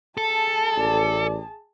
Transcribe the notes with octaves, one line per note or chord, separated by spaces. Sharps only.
G#4 A4 A5
A1 D5